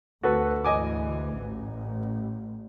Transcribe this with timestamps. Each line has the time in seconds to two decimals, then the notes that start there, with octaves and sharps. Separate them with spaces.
0.23 D2 F#4 A4 B4
0.65 D2 G#2 E3 D#5 G#5 D6
1.38 A1